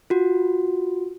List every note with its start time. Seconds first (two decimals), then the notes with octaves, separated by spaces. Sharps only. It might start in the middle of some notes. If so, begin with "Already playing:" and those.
0.10 F4 F#4